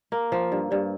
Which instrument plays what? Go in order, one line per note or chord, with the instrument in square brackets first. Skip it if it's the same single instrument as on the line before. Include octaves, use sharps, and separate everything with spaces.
[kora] A#3 [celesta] A#4
[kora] F3 [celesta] C5
[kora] G2
[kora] G2 [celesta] D5